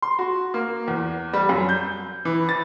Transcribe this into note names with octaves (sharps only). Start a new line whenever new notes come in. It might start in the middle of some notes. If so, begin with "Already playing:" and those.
C6
F#4
A#3
E2
G3
F#2
G6
E3
A6